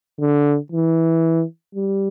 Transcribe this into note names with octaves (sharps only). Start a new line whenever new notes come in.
D3
E3
G3